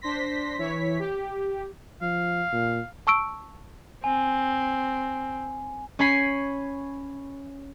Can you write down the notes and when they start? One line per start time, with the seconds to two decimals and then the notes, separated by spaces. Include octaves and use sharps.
0.02 D4 C5 C6 A#6 B6
0.58 E3 E4 C#5 B6
0.99 G4
2.02 F3 F5
2.53 A#2
3.07 A5 C#6 E6 D7
4.04 C4 G#5
5.99 C#4 C#5 G#5 B5 C7